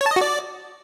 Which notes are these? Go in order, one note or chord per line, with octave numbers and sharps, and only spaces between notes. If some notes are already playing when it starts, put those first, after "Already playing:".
C#5
A5
D#5
F#4
D5